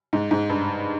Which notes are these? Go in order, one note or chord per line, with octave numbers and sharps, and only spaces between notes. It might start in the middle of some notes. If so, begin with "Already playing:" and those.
G#2
G#2
G2